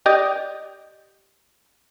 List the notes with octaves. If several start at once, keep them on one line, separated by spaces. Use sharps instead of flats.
G4 D5 D#5